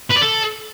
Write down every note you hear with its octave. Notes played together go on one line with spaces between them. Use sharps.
B4
D5
A4